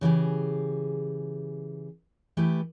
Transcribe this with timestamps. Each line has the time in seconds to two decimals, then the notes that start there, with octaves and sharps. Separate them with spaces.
0.01 C#3 E3 G4 G#4
2.37 E3 A3 E4 G4 B4